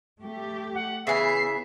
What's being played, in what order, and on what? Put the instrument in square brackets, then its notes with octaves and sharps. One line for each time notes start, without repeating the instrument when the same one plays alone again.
[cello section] A3 G4
[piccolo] F#5
[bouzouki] C#3 E3 [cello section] B3 [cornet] E5 [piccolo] C7